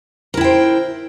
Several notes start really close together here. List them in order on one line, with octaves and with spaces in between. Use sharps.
A#4 E4 G5 C5